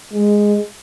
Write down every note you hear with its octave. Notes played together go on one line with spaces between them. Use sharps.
G#3